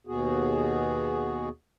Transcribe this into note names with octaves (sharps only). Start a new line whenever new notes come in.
D#2 B2 B3 F#4 G#4